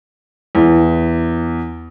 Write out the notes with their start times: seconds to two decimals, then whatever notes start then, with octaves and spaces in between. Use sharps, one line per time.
0.55 E2